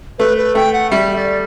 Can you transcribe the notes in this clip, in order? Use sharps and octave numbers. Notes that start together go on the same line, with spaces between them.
A3 B4
B4
A3 G5
F#5
G3 E5
D5